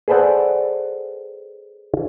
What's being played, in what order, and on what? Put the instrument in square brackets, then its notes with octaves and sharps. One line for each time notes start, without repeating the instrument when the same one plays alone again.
[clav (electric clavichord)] G#4 A4 B4 C5 D5 F#5